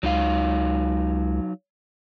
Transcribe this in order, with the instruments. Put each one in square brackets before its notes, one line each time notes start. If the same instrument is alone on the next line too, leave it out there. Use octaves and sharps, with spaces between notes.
[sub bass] C#2 [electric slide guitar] F#3 D#4 F5